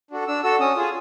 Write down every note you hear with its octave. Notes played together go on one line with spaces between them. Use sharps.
D4 F#4 A4
D4 E6
F#4 A4 E6
C#4 D#6
F4 G#4